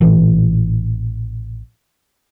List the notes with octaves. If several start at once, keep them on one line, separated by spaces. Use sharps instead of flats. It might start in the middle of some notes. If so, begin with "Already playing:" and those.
A1 A#2 E3